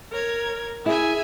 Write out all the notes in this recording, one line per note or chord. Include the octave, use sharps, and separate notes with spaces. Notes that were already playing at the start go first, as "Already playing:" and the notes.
A#4 C#5 G#6
E4 G#4 E5 G#5